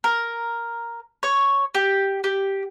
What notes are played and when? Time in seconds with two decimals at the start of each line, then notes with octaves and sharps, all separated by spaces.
0.04 A#4
1.23 C#5
1.75 G4
2.24 G4